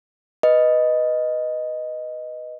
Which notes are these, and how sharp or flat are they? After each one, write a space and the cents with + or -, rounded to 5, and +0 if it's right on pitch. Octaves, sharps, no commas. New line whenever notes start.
B4 +0 D#5 +0